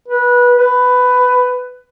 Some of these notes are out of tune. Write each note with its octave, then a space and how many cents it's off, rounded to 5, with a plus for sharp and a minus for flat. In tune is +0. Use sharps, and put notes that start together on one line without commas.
B4 -20
B4 +15